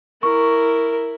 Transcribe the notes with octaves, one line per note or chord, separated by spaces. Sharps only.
E4 A#4 C#6